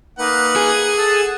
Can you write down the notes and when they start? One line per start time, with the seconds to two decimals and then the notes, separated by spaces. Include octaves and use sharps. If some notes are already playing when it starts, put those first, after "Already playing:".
0.19 A#3 D#4 B4 F#5
0.56 G#4
0.98 A4 A5 E6